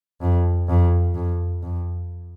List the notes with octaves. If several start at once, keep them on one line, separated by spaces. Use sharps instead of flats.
F2
F2
F2
F2